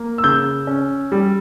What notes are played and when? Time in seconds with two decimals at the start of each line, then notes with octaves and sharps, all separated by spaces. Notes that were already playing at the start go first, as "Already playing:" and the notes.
Already playing: A#3
0.18 E6
0.24 C#3 G6
0.67 C#4
1.12 G3